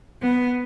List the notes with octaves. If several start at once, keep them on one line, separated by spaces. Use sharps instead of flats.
B3